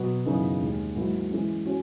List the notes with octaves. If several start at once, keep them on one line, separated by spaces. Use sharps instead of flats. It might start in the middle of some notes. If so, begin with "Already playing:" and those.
Already playing: B2 F#3 B3 F#4 B4
F#2 C#3 E3 B3 D#4
D#2 D#3 G#3
G#2 D#3 F#3 A#3 E4
E3 G#3 C#4
C#4 F#4